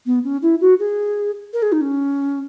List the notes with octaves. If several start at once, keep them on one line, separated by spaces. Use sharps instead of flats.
B3
C#4
E4
F#4
G#4
A#4
G#4
D#4
C#4